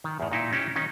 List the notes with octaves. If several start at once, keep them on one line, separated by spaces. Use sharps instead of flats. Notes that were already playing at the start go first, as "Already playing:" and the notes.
D#3
E2 A2
A#2 D#4 E4
C#4 D#4 E4 G4
D#3 C#4 D#4